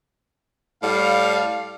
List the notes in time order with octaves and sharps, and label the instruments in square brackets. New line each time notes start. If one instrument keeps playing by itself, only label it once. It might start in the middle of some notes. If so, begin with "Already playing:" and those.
[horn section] A2 G3 F5